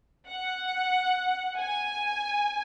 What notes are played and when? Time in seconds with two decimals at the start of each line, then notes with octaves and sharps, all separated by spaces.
0.28 F#5
1.60 G#5